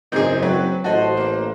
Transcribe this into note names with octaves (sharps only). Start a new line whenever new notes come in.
F#1 G#2 C4 D#4 G#4 G6
F#3 C4 B4
A1 F#4 A4 B4 C5 D#5 A5
A#3